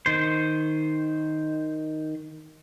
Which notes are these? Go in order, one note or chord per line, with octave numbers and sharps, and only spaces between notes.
D#3 C5